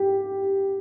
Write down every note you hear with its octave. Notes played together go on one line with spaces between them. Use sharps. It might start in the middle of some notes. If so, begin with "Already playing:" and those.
Already playing: G4